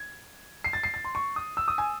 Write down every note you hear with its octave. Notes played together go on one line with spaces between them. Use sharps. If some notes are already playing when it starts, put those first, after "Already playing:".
Already playing: G#6
C7
A6
C7
A6
C6
C#6
D#6
E6
D#6
G#5